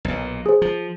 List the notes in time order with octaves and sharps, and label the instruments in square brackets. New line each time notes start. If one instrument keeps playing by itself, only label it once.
[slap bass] B1 A#2
[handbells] G#4 C5
[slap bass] F3